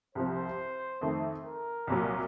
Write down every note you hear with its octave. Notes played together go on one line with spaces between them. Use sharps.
C2 C3 F3 C4 C5
F2 D#3 A3
A#4
C2 A#2 F#3